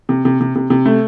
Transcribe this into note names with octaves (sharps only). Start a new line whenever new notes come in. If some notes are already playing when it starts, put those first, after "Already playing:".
C3
C3
C3
C3
C3
A3